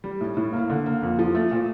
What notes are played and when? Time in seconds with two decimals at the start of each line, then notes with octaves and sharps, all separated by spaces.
0.04 G3
0.21 A2
0.37 A2
0.53 A#3
0.70 D3
0.86 A#3
1.02 F2
1.19 F3
1.35 A3
1.51 A#2